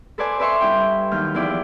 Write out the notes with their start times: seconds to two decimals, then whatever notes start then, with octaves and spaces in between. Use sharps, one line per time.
0.18 A4 B4 C5 D5 G#5
0.40 B4 D5 E5 A5 C6 C#6
0.60 G2 E4 G5
1.11 D#2 F#3 F6 G6
1.34 E2 F3 E4 D5 G5